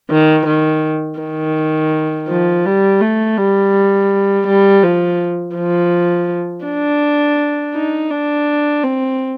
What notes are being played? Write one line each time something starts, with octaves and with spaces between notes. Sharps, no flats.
D#3
D#3
D#3
F3
G3
A3
G3
G3
F3
F3
D4
D#4
D4
C4